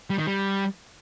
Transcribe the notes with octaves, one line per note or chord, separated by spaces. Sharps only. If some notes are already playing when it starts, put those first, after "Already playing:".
G3
D#3
G3